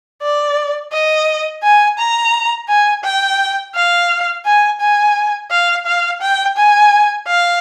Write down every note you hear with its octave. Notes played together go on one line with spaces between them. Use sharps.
D5
D#5
G#5
A#5
G#5
G5
F5
G#5
G#5
F5
F5
G5
G#5
F5